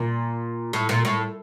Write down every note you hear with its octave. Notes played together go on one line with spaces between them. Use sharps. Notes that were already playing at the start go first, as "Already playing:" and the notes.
Already playing: A#2
A2
A#2
A2